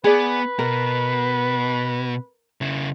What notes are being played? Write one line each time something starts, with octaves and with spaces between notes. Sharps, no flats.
B3 G#4 B4 D5
B2 A#4
C#3 E4